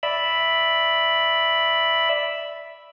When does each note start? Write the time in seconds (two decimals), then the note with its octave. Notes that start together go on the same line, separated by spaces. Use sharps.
0.03 D5 E5 B5